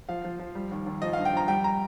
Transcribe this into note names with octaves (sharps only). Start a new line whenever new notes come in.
F3 F5
F3
F3
G3
D#2
D#2
F3 D#5
G2 F5
G5
F3 A#5
G3 G5
A#5